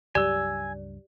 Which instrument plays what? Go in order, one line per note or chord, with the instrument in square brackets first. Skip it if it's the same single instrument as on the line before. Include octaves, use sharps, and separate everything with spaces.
[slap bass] C#2 G2 F#3 [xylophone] G4 [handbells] D5 [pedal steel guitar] G#5 E6